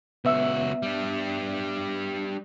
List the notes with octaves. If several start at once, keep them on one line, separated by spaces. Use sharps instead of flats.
C#2 B3 F#4 E5 E6
G3 D4